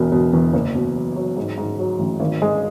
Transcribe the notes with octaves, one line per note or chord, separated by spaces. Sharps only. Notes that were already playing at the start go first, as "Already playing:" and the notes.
Already playing: E1 B2
B2
E2
F#1
B2
F#3
F#3
G#2
G#2
F#3
A1
G#1
G#3